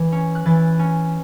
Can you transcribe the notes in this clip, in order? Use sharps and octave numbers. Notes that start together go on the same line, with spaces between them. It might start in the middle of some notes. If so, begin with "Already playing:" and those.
Already playing: E3
C#4
F#6
E3 A6
C#4